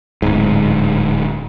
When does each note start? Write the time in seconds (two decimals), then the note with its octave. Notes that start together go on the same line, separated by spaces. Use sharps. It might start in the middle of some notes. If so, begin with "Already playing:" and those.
0.22 D1 G#2